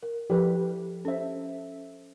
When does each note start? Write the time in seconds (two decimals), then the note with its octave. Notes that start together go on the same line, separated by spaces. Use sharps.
0.02 A#4
0.30 F3 G4 A4 B4
1.05 C#4 A4 C5 E5